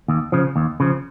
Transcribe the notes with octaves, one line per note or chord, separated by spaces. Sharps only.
D#2
C#3 F3
D#2
C#3 F3